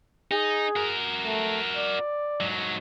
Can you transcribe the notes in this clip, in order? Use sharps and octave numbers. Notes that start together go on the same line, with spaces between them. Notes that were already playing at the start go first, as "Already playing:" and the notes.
D#4 G#4
F#4 A#4
A3
D5
G#2 F#3